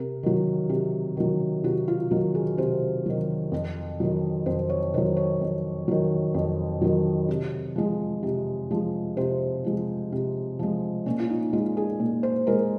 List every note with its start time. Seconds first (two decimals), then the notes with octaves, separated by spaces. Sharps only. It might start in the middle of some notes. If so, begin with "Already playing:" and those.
Already playing: C3 A#4
0.23 D#3 F#3
0.70 C3
1.17 D#3 F#3
1.64 C3 F#4
1.88 F4
2.11 D#3 F#3 F#4
2.35 G#4
2.57 C3 C5
3.06 D#3 F#3
3.52 F2
4.00 D#3 F#3
4.46 F2 C5
4.69 C#5
4.94 D#3 F#3 C5
5.17 C#5
5.41 F2
5.88 D#3 F#3
6.34 F2
6.81 D#3 F#3
7.28 C3
7.76 F3 G#3
8.23 C3
8.71 F3 G#3
9.17 C3 C5
9.64 F3 G#3
10.12 C3
10.59 F3 G#3
11.06 A#2 C#4
11.19 F4
11.30 D#4
11.53 G#3 F4
11.77 G#4
12.00 A#2
12.23 C5
12.47 G#3 A#4